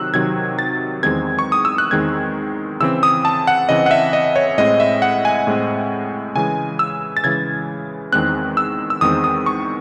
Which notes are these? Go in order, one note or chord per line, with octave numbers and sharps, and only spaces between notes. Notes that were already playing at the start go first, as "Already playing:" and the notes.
Already playing: C3 D#3 F#3 C4 E6 F#6
C3 D#3 F#3 C4 G#6
A6
E2 D#3 G#3 C4 G#6
C#6
D#6
E6
F#6
E2 D#3 G#3 C4 G#6
C#3 E3 C4 E6
D#6
A5
F#5
C#3 E3 C4 D#5
F#5
E5
D#5
C#5
A2 G#3 C4 D#5
E5
F#5
G#5
A2 G#3 C4
C#3 E3 G#3 G#5
E6
A6
C#3 E3 G#3 G#6
E2 D#3 G#3 C4 F#6
E6
E6
E2 D#3 G#3 C4 D#6
D#6
C#6